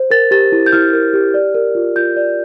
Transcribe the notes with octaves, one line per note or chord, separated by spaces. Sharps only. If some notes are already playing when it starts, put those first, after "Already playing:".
Already playing: C5
A#4 A6
G4 A6
E4
G6
E4 F6
A#4
G4
D5
A#4
F4
F4 G6
D5